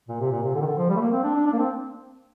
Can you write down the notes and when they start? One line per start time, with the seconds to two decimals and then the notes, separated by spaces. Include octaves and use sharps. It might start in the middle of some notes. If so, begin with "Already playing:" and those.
0.08 A#2
0.20 C3
0.31 A#2
0.43 C3
0.54 D3
0.62 D#3
0.66 D3
0.77 F3
0.89 G3
0.96 A3
1.01 A#3
1.12 C4
1.24 D4
1.35 D4
1.47 D4
1.53 A#3
1.59 C4